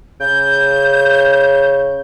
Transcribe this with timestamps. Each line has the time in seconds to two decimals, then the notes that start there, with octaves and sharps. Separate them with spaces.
0.20 C#3 G6